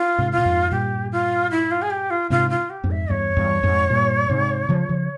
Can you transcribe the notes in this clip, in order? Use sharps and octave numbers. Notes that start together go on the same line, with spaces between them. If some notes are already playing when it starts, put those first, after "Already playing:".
Already playing: F4
G#2 C3
F4
A#2
F2 G#2
G2 A#2 G4
F4
E4
F4
G#4
G4
F4
G#2 C3 F4
F4
G4
F2 G#2
E5
E2 G2 C#5
E2 G2
F2 G#2
G2 A#2
G#2 C3
C#3 F3
C#3 F3